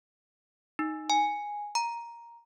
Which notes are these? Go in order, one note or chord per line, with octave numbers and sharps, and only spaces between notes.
D#4
G#5
A#5